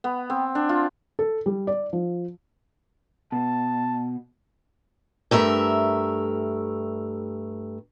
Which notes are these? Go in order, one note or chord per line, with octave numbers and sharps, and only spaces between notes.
B3
C4
D4
F4
A4
G3
D5
F3
B2 A5
G2 A3 A#4 E5